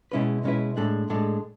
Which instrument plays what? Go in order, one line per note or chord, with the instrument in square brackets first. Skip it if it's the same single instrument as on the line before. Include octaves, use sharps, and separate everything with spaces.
[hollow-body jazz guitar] B2 G#3 C#4 E4 B4
B2 G#3 C#4 E4 B4
A2 G#3 D4 A4
A2 G#3 D4 A4